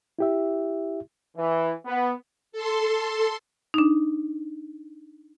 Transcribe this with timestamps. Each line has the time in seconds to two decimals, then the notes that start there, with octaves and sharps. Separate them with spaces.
0.19 E4 G4 E5
1.37 E3
1.86 B3
2.52 A4 C6
3.74 D4 D#4